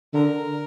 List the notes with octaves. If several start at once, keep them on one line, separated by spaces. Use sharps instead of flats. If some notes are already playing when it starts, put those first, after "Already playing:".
D3 A#4